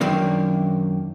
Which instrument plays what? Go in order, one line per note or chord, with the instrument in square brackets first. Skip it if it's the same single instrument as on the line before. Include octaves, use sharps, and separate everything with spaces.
[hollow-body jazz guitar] F#2 D#3 F#3 A#3 D4